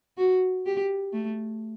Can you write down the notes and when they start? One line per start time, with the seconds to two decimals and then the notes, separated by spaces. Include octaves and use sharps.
0.18 F#4
0.66 G4
1.13 A3